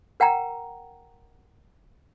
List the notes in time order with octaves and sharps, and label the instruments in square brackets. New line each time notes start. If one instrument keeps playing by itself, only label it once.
[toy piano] A#4 F#5 G5 A#5